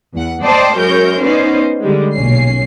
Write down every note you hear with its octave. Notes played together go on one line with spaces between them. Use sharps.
E2 F#5
C5 D5 D#5 G5 A5
F#2 G#3 A#4 C#5 G6
B3 C#4 D#4 C5 D5
D3 G3 G#3
B1 A#2 C#4 C7